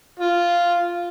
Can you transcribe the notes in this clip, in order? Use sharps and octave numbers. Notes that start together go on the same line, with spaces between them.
F4